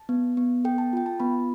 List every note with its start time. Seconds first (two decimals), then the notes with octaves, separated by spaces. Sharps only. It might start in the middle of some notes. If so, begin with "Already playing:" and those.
Already playing: A5
0.09 B3
0.37 B3
0.65 A4 G5
0.78 A5
0.93 F4 G5
1.06 A5
1.20 B3 B5